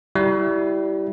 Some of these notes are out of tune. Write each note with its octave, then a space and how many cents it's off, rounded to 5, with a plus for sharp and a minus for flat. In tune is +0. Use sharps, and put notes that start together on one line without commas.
G3 -15 E4 +0